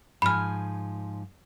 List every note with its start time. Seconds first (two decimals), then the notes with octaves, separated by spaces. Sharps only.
0.22 G#2 F3 G#5 B5 F6